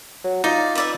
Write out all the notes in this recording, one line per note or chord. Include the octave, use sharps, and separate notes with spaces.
F#3
D#4 F4 D5
B4 D5 E5